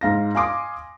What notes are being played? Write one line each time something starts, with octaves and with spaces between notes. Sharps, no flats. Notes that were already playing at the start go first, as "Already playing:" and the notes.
G#2 F5 A#6
F5 G#5 C6 D6 D#6